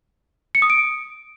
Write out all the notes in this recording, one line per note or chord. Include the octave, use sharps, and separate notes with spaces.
C#7
D#6
D7